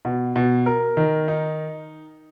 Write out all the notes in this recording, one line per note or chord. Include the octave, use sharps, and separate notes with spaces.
B2
B2
A#4
D#3
D#4